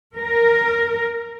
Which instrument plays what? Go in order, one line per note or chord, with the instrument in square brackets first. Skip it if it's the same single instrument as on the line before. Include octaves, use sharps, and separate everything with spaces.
[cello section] A#4